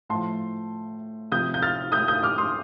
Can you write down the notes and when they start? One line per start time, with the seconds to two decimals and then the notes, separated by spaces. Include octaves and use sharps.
0.09 A2 F3 A5 C6
1.32 C3 F3 D#6 G6
1.54 G6
1.62 F6 A6
1.92 D#6 G6
2.08 D#6 G6
2.23 D6 F6
2.38 C6 D#6